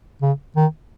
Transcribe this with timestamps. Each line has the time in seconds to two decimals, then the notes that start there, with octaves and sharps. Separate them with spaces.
0.22 C#3
0.56 D#3